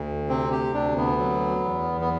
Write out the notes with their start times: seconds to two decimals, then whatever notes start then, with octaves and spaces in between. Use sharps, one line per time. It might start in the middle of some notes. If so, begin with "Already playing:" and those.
Already playing: D2
0.29 C3 C4
0.52 G4
0.74 D2 D4
0.97 B3
1.19 F#3
1.64 E2
2.01 B3